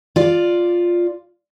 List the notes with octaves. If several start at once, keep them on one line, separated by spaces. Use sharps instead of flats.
F4 D5